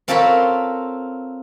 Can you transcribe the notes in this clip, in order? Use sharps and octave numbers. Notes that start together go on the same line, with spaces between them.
C4 F4 A4 A#4 C#5 B5